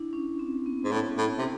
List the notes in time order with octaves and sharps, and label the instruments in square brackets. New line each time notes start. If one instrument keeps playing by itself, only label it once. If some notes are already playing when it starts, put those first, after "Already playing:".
Already playing: [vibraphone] D4 E4
C#4
C4
B3
[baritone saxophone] G#2
A2
A2
C3